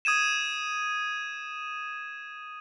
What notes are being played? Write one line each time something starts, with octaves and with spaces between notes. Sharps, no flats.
D#6 G#6 D#7 E7